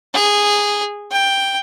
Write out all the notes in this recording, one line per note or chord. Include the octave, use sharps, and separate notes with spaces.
G#4
G5